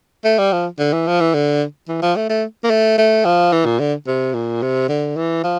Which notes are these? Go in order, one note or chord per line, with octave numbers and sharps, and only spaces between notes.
A3
G3
F3
D3
E3
F3
E3
D3
E3
F3
A3
A3
A#3
A3
A3
F3
E3
A#2
D3
C3
A#2
C3
D3
E3
F3